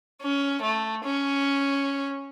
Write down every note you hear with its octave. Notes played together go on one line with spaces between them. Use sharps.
C#4
A3
C#4